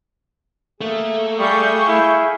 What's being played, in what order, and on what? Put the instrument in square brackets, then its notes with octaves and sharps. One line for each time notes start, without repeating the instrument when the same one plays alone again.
[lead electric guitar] A3 [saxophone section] A#3 G#4
[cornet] G3 [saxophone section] G#4 F5 [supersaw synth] C#6 G6
[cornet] E4